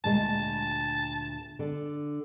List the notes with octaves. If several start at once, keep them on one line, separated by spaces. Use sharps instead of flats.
D2 A#2 G#3 A5
D3